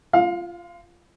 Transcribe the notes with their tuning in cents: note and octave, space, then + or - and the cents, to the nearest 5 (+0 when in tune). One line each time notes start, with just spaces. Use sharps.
F4 -20 F5 +30